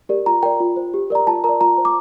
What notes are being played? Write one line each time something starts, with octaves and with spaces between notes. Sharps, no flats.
G4 A#4 D5
F4 A#5
A#4 D5 G5
F4
C5
G4
A#4 D5 A#5
F4 A5
A#4 D5 A#5
F4 A#5
C5
D6